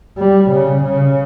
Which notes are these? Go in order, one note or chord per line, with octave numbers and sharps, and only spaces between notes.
G3
C#3
C#3